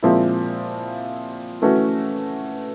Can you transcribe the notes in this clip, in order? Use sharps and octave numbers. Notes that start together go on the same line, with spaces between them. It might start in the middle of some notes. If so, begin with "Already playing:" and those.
A#2 F3 G#3 C4 E4
E3 A3 C#4 F#4